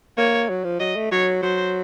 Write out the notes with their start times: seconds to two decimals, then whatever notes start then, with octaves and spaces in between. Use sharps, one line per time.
0.18 A#3 C#5
0.49 F#3
0.64 F3
0.80 F#3 D#5
0.96 A3
1.12 F#3 C#5
1.43 F#3 C5